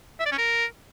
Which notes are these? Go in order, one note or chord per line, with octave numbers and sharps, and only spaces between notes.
E5
D5
C#4
A#4